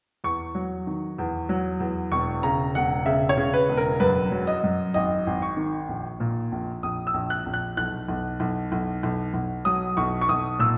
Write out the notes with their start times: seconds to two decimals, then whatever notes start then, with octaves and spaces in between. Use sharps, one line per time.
0.24 E2 C#6
0.55 F#3
0.87 D#3
1.18 E2
1.49 F#3
1.80 E2
2.12 E1 C#6
2.43 C#3 A#5
2.75 E1 F#5
3.06 C#3 E5
3.29 C#5
3.37 C#3
3.54 B4
3.69 E1
3.77 A#4
4.00 F#2 B4
4.31 F#3
4.47 D#5
4.64 F#2
4.94 G#1 D#5
5.27 G#1
5.42 C#6
5.57 D#3
5.89 A#1
6.20 A#2
6.52 A#1
6.83 A#1 D#6
7.07 E6
7.14 A#1
7.30 F#6
7.46 A#1
7.54 F#6
7.77 B1 F#6
8.08 B1
8.40 B1
8.72 B1
9.03 B1
9.34 B1
9.65 F#3 D#6
9.97 B1 C#6
10.21 C#6
10.29 B1 D#6
10.59 A#2 E6